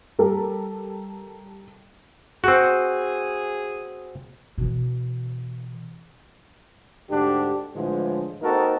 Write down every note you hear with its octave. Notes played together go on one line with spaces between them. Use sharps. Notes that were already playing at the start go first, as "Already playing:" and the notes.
G3 G4 A4 A#4
C4 F#4 G#4
B2 E3
D2 G#2 D3 D4 G4
A2 D3 E3 F3 G#3
A#3 C4 D#4 F#4 A4 A#4